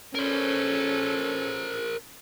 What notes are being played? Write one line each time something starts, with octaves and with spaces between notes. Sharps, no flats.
C#4 A4 A#4 C5